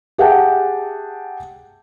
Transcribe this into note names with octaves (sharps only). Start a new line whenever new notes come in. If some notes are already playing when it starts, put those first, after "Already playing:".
G4 G#4 E5 F#5 G5 A5